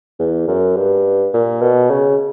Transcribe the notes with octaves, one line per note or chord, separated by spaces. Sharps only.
E2
F#2
G2
A#2
B2
C#3